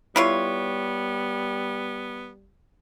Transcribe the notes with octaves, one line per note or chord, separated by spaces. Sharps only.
G3 B3 E4 F4 C#5